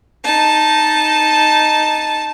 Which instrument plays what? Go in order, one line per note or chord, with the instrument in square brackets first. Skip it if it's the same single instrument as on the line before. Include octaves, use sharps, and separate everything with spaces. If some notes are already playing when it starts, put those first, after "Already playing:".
[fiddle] D#4 A5